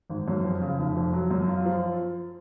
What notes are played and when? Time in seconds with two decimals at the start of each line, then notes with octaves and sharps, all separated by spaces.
0.10 G#1
0.28 F#2
0.45 F2
0.61 C#3
0.79 F1
0.96 F2
1.13 F#3
1.31 F#2
1.48 F4
1.66 F3